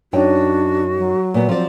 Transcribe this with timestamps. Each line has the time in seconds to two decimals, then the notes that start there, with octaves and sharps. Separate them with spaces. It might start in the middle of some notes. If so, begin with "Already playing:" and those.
0.13 F#2 D4 D#4 F#4 G5
0.98 F#3
1.34 A#2 B3
1.49 F3 C4 D5